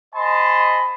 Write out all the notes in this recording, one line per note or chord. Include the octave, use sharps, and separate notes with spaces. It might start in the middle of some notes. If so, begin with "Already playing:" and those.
C5 D#5 G#5 A5 B5 C6